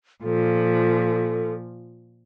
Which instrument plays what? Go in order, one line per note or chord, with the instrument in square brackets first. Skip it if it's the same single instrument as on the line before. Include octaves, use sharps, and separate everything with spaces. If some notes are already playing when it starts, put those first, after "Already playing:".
[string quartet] A#2 F3 [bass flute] A4